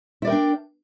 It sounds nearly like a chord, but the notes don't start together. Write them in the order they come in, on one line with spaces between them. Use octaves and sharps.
E4 D5 A#4 G5 D4